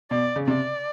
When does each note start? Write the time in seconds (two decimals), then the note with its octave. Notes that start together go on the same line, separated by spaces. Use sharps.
0.11 B2 D5
0.36 C#3
0.47 C3 D5